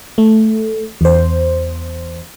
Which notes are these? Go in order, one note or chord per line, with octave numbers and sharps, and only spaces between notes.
A3
E2 C5